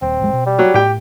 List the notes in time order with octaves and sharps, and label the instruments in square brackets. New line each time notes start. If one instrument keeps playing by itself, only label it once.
[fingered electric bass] D#1 [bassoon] C4
[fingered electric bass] A1 F2 G#3
B2
[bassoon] G3
[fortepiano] F#3
[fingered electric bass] A2 [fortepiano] G4 G5